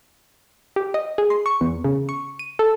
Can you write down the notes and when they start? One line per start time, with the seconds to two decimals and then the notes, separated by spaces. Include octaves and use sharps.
0.76 G4
0.94 D#5
1.18 G#4
1.30 C6
1.46 C#6
1.61 E2
1.84 C#3
2.09 C#6
2.39 D#7
2.59 A4